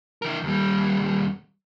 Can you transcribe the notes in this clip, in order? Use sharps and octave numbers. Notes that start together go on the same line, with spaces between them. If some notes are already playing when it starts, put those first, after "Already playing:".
E3 A#4
D#2 G3